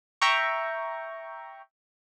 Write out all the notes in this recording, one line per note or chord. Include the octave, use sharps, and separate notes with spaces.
E5 G5 A#5 C#6